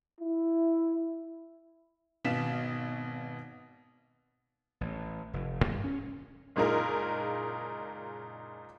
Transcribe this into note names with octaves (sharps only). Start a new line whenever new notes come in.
E4
G#1 B2 F5 B6 E7
A1
F1
G2
C#4
F#1 A#2 G#3 D#4 F4 A#4